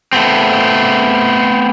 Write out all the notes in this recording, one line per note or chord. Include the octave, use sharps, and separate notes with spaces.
A3 B3 C4